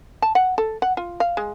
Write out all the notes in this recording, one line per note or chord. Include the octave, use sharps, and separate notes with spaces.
A5
F#5
A4
F#5
F4
F5
G#3